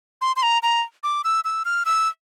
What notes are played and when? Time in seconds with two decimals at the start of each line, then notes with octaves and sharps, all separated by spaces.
0.21 C6
0.36 C6
0.43 A#5
0.63 A#5
1.03 D6
1.24 E6
1.44 E6
1.65 F6
1.86 E6